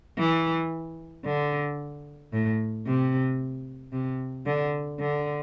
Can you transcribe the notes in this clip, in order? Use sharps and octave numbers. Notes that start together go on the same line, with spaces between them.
E3
D3
A2
C3
C3
D3
D3